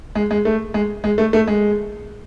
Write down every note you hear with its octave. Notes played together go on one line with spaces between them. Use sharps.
G#3
G#3
A3
G#3
G#3
A3
A3
G#3